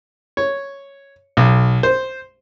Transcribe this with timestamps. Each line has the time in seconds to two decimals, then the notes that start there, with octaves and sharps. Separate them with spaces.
0.37 C#5
1.37 B1
1.83 C5